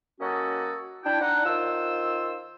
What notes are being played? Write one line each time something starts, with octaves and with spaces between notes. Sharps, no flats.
F#3 A#3 C#4 F#4 A4 D#5
D4 E4 G5
D4 D#4 F#5
D#3 F4 C5 E6